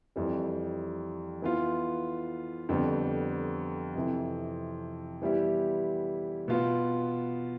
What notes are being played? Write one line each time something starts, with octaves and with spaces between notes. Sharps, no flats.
F2 E3 G3
E3 B3 F4
F2 D3 G3 B3
F2 C3 E3
E3 G3 B3 E4 G4
B2 B3 F4